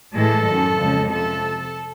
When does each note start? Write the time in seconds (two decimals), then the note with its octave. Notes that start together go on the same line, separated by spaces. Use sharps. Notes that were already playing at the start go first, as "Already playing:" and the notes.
0.14 A2 E3 G#3 A4
0.47 F#2 D#3 F#3
0.79 F2 C#3 F3 G#3
1.10 C3 F3 A4